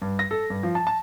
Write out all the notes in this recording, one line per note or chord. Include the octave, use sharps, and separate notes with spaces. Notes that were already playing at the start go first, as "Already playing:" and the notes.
G2
A#6
A4
G2
F3
A5
A5